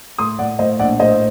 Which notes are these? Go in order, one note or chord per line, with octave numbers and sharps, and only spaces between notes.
A2 C6 D#6
A2 D5 F#5
A2 C5 D#5
A#1 D5 F#5
A2 C5 D#5